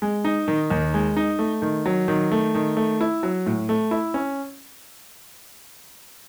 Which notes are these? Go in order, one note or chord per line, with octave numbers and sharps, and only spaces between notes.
G#3
D#4
D#3
D#2
G#3
D#4
A3
D#3
F#3
D#3
A3
D#3
A3
E4
F#3
A2
A3
E4
C#4